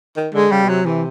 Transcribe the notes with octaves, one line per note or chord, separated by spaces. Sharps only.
D#3
D3 G#3
C#3 G3
B2
C3 F#3
C3 E3